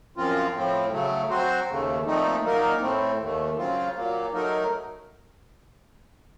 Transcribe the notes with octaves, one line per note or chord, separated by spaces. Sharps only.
F#2 F3 C4 F4
A2 F3 C4
C#3 F#3 A3
F#3 C4 F#4 C5
D#2 C#3 A3
A#2 F3 A3 C4 D#4
A#2 F#3 A#3 D#4 A#4
A2 A3 C4
D#2 D#3 A3
C#3 F#3 C4 F4
A#2 F#3 A#3
F#3 A3 D#4 A#4